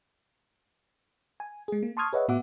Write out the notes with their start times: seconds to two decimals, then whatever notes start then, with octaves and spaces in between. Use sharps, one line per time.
1.40 G#5
1.68 G#3 G#4
1.83 A#3
1.97 A5 C6 C#6 D#6 F6 G#6
2.13 G#4 B4 C#5 D#5 E5 F#5
2.28 A2 B3 F#4 E5 F#5 D6